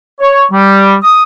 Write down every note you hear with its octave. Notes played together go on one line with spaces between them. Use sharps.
C#5
G3
D#6